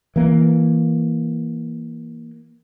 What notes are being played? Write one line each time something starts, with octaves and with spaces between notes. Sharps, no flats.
E3 A#3